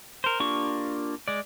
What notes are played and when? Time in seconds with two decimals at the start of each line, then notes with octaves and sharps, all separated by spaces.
0.24 A#4 C5
0.40 A#3 D4 F4 G4 C#6
1.28 G#3 D5